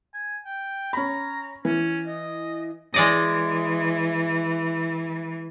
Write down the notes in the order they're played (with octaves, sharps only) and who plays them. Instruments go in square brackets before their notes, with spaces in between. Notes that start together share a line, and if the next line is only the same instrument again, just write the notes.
[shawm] G#5
G5
[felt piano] C#4 B5 [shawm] A#5
[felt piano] E3 [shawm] C#4
[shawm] D#5
[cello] E3 [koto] G#3 D5 D#5